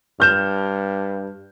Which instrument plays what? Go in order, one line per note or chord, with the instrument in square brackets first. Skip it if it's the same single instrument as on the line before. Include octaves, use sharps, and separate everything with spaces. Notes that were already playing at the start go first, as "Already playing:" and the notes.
[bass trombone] G2 [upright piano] F6 G6 E7